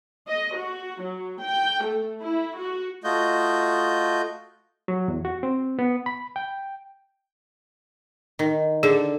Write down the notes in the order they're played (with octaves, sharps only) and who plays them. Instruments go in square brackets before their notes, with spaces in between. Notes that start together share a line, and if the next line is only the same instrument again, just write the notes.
[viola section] D#5
F#4
F#3
G5
A3
E4
F#4
[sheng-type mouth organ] A3 F4 F#4 D#5 G6
[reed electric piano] F#3
E2
F#4
C4
B3
B5
G5
[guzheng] D#3
[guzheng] D3 [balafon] G#4